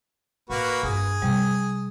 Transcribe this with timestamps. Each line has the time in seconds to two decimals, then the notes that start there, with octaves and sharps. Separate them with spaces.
0.50 A2 A#3 F#4 B4
0.83 G2 D#4 G#4
1.22 C3 F3 G3